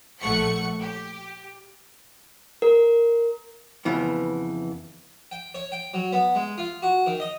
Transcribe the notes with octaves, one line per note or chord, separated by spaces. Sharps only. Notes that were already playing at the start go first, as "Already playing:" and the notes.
A#1 A3 F#5 C#6 C#7
G4
A#4
F2 C#3 E3 B3
G5
C#5
G5
F#3
B3
G#3
F4
F#4
D#3
D#5